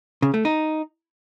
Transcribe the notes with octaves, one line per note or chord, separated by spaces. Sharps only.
C#3
A3
D#4